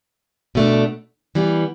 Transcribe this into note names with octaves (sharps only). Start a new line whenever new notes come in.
B2 A3 D4
E3 G3 B3